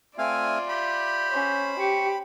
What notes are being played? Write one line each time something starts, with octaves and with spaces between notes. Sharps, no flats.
A3 C4 F4 D5 E5 F5 G#5
G4 B5
C#4 C5
G4 C#6